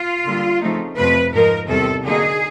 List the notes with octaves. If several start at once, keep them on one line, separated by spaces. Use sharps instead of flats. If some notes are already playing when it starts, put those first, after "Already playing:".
Already playing: F4
D3 G3 A#3
C#3 F3 A3 C4 D#4
F2 C3 F3 A3 C4 B4
G#2 F3 A#3 D#4 A#4
E2 C3 D#3 G3 A4
D3 F#3 A#3 D#4 G#4